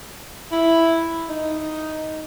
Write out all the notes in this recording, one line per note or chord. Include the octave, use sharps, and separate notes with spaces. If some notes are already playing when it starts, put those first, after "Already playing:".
E4
D#4